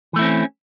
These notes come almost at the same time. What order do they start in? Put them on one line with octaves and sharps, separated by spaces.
E3 A3 E4 C4 C#4